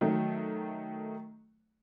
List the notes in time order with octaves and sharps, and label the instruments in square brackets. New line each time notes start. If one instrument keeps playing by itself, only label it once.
[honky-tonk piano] D#3 F#3 A3